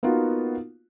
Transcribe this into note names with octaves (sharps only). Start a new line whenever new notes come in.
A#3 B3 D#4 F4 F#4